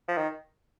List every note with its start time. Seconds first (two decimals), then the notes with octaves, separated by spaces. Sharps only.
0.08 F3
0.17 D#3